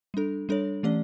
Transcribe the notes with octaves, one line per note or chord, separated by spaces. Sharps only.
G3 D4 A4
G3 D4 A4 C#5
E3 A3 C#4 G4 D5